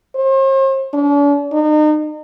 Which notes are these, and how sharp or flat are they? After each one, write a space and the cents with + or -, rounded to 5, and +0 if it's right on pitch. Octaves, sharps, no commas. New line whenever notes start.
C5 +45
D4 -45
D#4 -35